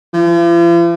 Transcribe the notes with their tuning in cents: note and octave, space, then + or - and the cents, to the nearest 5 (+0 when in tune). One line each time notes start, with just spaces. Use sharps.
F3 -45